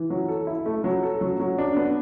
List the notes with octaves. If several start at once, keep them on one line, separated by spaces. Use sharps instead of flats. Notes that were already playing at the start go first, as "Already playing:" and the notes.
Already playing: E3
F#3
A4
E4
A3
F#3
A4
F#3
F#3
D4
B3